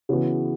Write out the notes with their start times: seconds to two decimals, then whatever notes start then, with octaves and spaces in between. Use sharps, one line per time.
0.09 C#3 E3 B3 F#4